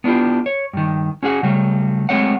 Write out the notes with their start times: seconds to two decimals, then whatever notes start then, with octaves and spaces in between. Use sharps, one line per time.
0.04 B3 D4 E4 F4 G4
0.46 C#5
0.73 G2 D#3
1.23 C#4 F#4 G#4 F#5
1.43 C#3 F#3 G3 A3
2.09 F#3 G#3 A3 C4 C#5 F#5